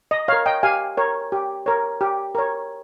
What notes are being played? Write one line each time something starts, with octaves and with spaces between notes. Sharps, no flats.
D#5
C#5 F5
A#4
D#5 G5
G4 F5 G#5
A#4 C#5
G4
A#4 C#5
G4
A#4 C#5